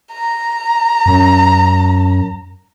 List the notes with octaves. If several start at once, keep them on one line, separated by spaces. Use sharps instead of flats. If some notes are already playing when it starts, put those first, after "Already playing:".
A#5
F#2